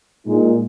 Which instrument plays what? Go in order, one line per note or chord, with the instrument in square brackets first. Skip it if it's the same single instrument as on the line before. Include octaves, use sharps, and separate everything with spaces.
[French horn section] A#2 G#3 D#4